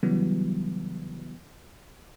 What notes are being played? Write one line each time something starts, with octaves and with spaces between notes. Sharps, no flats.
C#3 E3 F#3 G3 B3